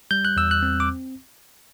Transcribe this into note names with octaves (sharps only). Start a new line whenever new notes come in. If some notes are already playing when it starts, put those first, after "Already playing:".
G3 G6
F#6
E2 E6
F#6
C4
D6